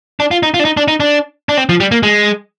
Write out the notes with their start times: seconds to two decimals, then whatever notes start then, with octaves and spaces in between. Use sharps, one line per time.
0.20 D4
0.31 F4
0.43 D#4
0.54 F4
0.60 D4
0.65 D#4
0.77 D4
0.88 D#4
1.00 D4
1.49 D4
1.57 C4
1.69 F3
1.80 G3
1.92 A#3
2.03 G#3